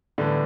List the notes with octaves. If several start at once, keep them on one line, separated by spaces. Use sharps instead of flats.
A2 D3 E3 G3 B3 D4